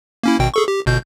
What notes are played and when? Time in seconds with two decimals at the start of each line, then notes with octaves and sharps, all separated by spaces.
0.23 A#3 C#4 E4
0.39 G#1 B2 G5
0.54 G#4 A4 C#6
0.68 G4
0.86 G1 B2 G6